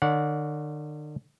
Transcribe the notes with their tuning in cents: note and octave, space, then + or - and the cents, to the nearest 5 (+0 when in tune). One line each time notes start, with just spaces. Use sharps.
D3 +45 D5 -45 F#5 -25